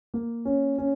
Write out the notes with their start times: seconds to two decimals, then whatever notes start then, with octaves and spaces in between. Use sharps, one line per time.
0.14 A#3
0.45 C#4
0.78 C#4